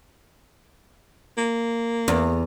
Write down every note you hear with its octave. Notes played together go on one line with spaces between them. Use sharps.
A#3
E2